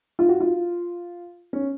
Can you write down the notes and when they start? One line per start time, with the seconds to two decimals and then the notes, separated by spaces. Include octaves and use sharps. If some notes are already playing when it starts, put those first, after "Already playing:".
0.19 F4
0.29 F#4
0.40 F4
1.53 C#4